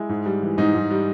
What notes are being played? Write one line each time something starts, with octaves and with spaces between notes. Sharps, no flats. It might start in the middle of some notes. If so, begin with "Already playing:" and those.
Already playing: G#3 E4
G#2
G3
E3
G#2 D#4
G#2
G3